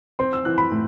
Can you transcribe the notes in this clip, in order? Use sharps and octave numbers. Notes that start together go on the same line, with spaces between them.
C4 C6
E6
E3 F#6
B5
A2